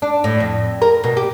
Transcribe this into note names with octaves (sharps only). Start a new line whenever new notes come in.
D4
A2
F2
A#4
B2
G4